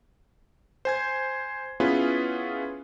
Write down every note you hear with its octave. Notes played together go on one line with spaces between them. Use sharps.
C5 G#5 G#6
B3 C#4 E4 F4 G#4 B4